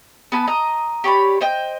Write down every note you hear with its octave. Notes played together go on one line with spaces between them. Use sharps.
B3 G#5 A5 B5
D#5 A#5
G4 C#5 D5 B5
C5 D#5 G5